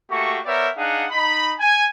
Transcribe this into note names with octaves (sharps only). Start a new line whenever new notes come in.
A3 A#3 F#4 G4 C#6
B3 A#4 C#5 D5 E5 G5
D4 D#4 G#4 F5 F#5
D#4 B5
G#5